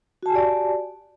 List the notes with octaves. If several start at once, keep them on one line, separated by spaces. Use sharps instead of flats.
F#4 G4 D5 G#5 A5